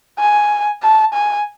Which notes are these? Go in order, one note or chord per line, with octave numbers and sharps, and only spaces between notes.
G#5
A5
G#5